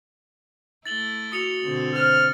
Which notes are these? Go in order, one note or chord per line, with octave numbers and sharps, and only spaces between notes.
A3 E4 A6 F#7 G7
F#4 D#6 C#7 F7
B2 D3 C4
C5 F6